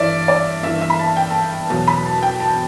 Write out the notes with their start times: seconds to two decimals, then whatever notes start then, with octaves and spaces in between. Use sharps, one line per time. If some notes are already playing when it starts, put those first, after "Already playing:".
Already playing: G2 E3 D5 E5
0.28 D5
0.63 G2 E3 E5
0.81 E5
0.90 B5
0.99 A5
1.17 G5
1.30 A5
1.70 E2 B2 F#3 A5
1.87 B5
2.06 A5
2.23 G5
2.40 A5